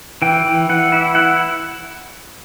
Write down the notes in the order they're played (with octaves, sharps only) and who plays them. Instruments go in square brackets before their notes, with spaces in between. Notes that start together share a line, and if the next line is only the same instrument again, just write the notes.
[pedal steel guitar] E3 G5
E3
E3 F#5
E4
E4 F#5